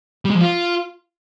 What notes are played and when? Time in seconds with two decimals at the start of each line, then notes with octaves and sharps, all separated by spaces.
0.25 G3
0.30 G#3
0.36 F3
0.41 F4